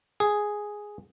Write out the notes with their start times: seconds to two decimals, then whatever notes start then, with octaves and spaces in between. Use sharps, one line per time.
0.20 G#4